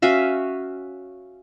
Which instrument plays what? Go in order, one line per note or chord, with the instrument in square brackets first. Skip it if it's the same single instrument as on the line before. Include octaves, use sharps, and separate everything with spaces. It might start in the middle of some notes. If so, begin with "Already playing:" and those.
[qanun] C#4 F#4 E5 F5